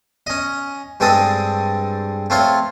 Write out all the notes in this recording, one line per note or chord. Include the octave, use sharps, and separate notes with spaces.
C#4 D#5
G2 G#3 C4 A4 D#6
A3 C4 F4 C5 C#5